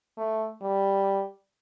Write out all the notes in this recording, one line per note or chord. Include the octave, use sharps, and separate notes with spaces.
A3
G3